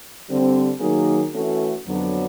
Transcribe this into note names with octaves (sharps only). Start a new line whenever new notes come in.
D3 G3 C4
D#3 F#3 A#3 D#4 G#4
E3 A3 C#4 F#4 A4
F2 D3 F#3 B3 D4